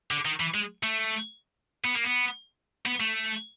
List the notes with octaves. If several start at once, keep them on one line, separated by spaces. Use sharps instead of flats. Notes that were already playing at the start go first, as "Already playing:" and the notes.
D3
D#3
E3
G#3
A3
B3
A#3
B3
B3
A3